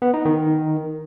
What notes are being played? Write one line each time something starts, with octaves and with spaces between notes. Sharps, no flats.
B3
D#4
D#3